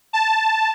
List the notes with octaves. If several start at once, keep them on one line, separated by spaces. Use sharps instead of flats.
A5